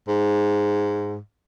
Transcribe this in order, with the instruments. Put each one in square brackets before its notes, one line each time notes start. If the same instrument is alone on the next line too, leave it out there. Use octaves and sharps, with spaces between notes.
[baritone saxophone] G#2